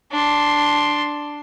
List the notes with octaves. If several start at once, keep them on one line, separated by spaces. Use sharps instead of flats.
D4 C6